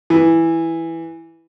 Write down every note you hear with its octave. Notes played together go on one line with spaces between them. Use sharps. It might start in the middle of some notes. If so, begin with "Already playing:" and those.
E3